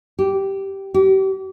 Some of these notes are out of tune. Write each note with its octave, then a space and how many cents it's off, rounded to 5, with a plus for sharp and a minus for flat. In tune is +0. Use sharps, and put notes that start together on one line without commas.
G4 -10
G4 -35